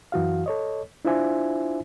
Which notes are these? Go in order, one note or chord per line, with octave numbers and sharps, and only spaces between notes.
F#2 E3 F#4 F5
A4 C#5 D#5
D4 E4 F4 C5 E5 G#5